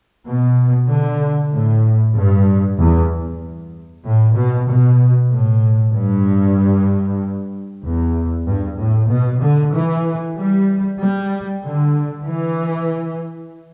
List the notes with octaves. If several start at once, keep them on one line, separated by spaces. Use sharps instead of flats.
B2
D3
A2
G2
E2
A2
B2
B2
A2
G2
E2
G2
A2
B2
D3
E3
G3
G3
D3
E3